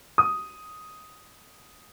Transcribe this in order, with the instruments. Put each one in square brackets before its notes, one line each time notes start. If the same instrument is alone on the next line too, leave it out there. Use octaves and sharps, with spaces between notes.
[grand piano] D#6